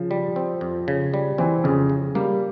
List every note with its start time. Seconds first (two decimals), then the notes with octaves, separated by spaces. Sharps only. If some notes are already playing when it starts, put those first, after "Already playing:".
Already playing: C#3 F3
0.11 G3
0.36 C4
0.61 F2
0.88 C#3
1.14 G3
1.38 E3 C4
1.64 F2 C#3
1.90 C#3
2.15 G3 A#3